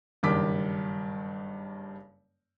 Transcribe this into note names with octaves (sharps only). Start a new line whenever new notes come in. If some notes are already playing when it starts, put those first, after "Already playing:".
F#1 G2 D#3 D6 B6